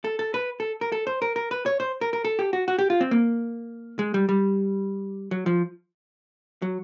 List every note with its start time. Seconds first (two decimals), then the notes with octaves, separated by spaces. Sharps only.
0.04 A4
0.19 A4
0.34 B4
0.60 A4
0.81 A#4
0.92 A4
1.07 C5
1.22 A#4
1.36 A#4
1.51 B4
1.66 C#5
1.80 C5
2.01 A#4
2.13 A#4
2.25 A4
2.39 G4
2.53 F#4
2.68 F#4
2.79 G4
2.90 F4
3.01 C4
3.11 A#3
3.99 G#3
4.14 G3
4.29 G3
5.31 F#3
5.46 F3
6.62 F#3